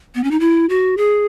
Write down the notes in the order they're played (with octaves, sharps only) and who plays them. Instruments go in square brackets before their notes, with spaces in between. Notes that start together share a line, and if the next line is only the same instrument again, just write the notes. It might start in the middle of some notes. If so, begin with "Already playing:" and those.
[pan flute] B3
C#4
D#4
E4
F#4
G#4